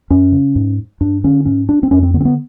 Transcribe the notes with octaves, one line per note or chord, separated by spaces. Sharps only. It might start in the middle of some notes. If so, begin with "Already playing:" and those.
F#2 C#4
C#3
G#2
G2 D4
D3 C#4
G#2 C#4
D4
C4
F2 C#4
C4
D3 B3
C4
B3